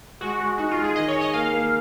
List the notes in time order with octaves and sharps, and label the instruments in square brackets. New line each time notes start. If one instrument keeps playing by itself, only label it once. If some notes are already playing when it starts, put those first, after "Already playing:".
[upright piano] G#3 [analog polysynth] F#4
[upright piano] G#3
[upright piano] D#4 [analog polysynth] F#4
[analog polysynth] F4
[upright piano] G#3
[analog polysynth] G#4
[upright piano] D#3 [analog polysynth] D#5
[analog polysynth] C#5
[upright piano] G#4
[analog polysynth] D#5
[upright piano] A#3 [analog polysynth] F5
[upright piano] A#3